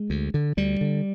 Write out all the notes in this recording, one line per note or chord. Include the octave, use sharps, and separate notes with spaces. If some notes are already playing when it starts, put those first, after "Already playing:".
Already playing: G#3
D2
D3
D2 G3
D3